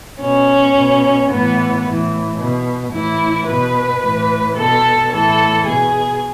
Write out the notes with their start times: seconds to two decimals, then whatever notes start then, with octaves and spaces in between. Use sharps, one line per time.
0.21 B2 C#4
0.75 B2
1.30 A2 E3 B3
1.85 A2 E3
2.39 B2
2.93 A2 E3 E4
3.47 B2 B4
4.03 A2 E3
4.56 B2 A4
5.11 A2 E3 A4
5.65 B2 G#4